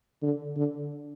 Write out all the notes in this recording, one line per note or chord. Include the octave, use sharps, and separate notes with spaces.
D3
D3